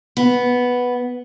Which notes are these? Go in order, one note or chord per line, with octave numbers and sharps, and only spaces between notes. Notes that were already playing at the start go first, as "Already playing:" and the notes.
B3